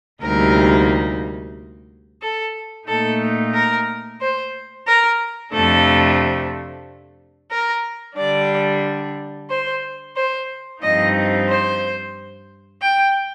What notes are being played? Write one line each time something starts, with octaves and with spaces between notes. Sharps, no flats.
D2 C3 G3 A#3 D#4 A#4
A4
A#2 A3 D#4 A4
A#4
C5
A#4
F2 C3 F3 A3 D4 A4
A#4
D3 G3 D4 D5
C5
C5
G2 F3 C4 D#4 D#5
C5
G5